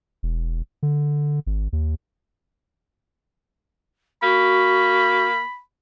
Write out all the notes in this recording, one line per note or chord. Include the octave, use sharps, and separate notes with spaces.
E1
D3
G#1
D#2
A#3 F#4 B5